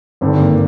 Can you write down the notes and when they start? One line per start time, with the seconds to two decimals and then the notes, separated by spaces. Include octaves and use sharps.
0.21 G#1 G2 D3 C4
0.40 A#3